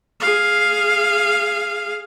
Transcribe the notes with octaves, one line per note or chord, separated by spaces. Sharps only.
G#4 F5